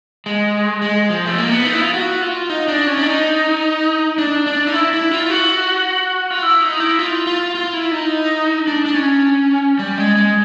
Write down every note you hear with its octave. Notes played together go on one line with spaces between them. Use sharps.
G#3
G#3
F3
A3
A#3
B3
D#4
E4
F4
F#4
F4
D#4
D4
C#4
D4
D#4
D4
D4
D#4
E4
E4
F4
F#4
F4
E4
D#4
E4
F4
F4
F4
E4
D#4
D4
D4
C#4
G3
G#3
G#3